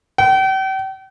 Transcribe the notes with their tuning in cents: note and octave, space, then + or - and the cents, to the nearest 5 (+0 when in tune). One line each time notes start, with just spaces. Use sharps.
G5 -40